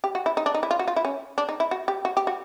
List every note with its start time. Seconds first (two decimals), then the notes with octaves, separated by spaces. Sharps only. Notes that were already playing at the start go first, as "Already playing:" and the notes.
0.04 G4
0.15 F#4
0.26 E4
0.37 D#4
0.46 D4
0.54 D#4
0.63 E4
0.71 F4
0.79 F#4
0.87 F4
0.96 E4
1.05 C#4
1.38 D4
1.49 D#4
1.60 E4
1.71 F#4
1.88 G4
2.05 F#4
2.17 G4
2.27 F#4